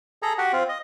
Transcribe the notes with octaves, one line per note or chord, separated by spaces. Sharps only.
G#4 A4 A#5
F#4 G4 F#5
C4 F4
D#5